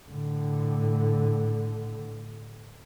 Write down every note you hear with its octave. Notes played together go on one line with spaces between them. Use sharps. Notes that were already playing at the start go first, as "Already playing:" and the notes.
A2 D3